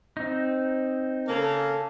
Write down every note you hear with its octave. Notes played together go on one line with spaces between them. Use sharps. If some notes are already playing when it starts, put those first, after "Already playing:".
C4 D#4
C#3 A#3 A4